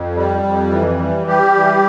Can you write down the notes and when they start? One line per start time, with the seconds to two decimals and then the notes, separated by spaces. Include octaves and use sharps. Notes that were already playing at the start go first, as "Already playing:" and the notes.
Already playing: F2
0.15 G3
0.43 F2
0.71 E3
0.99 G3
1.27 G3 G4
1.55 E3